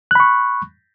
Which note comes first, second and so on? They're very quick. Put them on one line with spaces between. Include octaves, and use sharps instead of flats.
F#6 B5 C#6